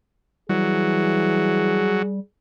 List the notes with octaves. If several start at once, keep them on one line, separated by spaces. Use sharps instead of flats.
E3 F#3 G3 G#4